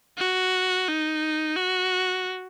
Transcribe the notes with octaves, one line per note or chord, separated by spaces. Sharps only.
F#4
D#4
F#4